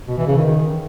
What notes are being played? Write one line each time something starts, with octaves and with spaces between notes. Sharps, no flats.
B2
E3
C#3
D#3